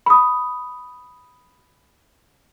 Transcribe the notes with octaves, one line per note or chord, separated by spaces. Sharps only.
B5 D#6